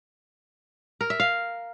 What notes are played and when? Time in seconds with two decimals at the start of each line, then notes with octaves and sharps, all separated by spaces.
1.01 A#4
1.10 E5
1.20 F5